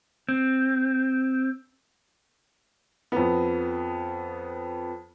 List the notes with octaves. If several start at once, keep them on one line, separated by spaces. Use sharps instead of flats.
C4
F2 B3